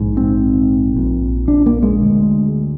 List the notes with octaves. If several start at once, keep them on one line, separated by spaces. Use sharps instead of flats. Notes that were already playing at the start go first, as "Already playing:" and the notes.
Already playing: A#1 G#2
C4
A#1 A#2
D4
A#3
G#3
D2 D3